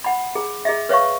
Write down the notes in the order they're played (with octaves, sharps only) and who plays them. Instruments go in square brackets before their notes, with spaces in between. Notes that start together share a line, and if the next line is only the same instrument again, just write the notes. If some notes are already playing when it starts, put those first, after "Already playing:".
[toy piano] F#5 B5
G#4
G#4 D#5 E5
B4 C#5 E5 F5 C#6